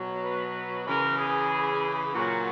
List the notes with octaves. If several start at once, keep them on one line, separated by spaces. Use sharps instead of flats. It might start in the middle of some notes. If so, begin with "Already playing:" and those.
Already playing: B2 F#3
B4
C#3 E3 A#4
G#4
A#2 F#3 F#4